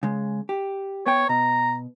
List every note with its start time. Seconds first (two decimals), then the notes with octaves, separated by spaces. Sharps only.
0.03 C#3 G#3
0.49 G4
1.06 B3 C#5 G5
1.29 B2 A#5